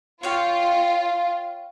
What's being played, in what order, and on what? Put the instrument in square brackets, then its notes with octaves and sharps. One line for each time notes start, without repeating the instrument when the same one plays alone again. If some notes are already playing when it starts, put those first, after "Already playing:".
[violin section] F4 [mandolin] C#5 F5 G5